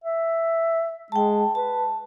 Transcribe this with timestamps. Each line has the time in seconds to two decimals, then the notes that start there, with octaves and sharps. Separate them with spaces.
0.04 E5
1.12 G#3 G5 A5
1.55 B4 A5